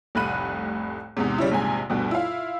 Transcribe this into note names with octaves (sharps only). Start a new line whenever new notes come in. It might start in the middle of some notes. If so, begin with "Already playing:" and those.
F1 C2 A2 B5 F#6 D#7
E2 G#2 C3
C#3 G3 C#4 E4
A#1 G#2 C3 G#5
D2 G2 B2
E4 F4 F5